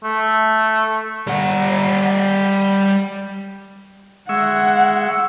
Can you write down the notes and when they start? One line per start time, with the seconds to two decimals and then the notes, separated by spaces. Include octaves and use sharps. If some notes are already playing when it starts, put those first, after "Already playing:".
0.04 A3
1.27 G3 F#5
4.29 G#3 E5 F#5 C#6